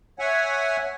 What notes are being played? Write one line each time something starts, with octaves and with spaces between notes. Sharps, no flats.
C#5 E5 F#5 G#5